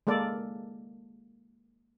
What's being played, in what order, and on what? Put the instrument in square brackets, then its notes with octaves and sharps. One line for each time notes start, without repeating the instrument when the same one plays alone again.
[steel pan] G#3 A#3 A4 D5